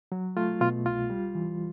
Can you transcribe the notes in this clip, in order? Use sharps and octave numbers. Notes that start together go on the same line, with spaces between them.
F#3
A3 F4
B2 F4
C2 F4
G3
E3